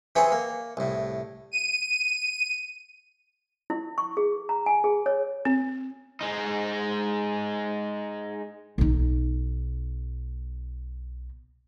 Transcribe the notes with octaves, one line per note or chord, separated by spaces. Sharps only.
E3 C4 G#4 B4 C#5
A#3
C2 A2
D#7
E4
C#6
G#4
A#5
G#5
G#4
C#5
C4
G#3 D#4
B1 D#4